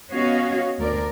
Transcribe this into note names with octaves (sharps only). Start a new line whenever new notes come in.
B3 C#4 F#4 C#5 D#5 F5
D2 A#4 D5